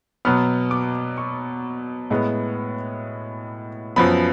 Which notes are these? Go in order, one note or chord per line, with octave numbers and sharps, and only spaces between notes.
B2 F#3 B3 F6
D6
C#6
A2 G#3 B3
F#2 F3 B3 B5